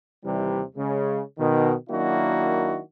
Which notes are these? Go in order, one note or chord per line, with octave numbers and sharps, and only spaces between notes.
D#2 C3 E3 G3
C#3 G#3
B2 D#3
D#3 F#3 A#3 D4 E4 F#4